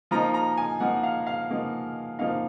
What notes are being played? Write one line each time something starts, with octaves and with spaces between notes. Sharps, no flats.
F3 A#3 D#4 A#5
A#5
G#5
F3 A#3 D#4 F#5
F5
F5
F3 A#3 D#4
F3 A#3 D#4 F5